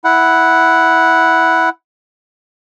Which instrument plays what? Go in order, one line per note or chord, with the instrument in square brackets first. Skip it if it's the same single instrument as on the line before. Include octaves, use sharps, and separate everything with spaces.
[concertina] E4 F#5